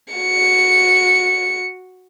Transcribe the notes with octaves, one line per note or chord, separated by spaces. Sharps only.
F#4 C#7